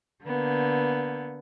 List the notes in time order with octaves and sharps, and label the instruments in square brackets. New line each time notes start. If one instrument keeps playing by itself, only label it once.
[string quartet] D3 A#3 B3